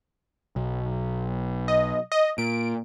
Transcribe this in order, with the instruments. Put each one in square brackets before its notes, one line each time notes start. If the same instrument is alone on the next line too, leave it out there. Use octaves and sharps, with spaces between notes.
[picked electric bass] B1
[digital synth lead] D#5
D#5
[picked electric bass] A#2 [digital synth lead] D7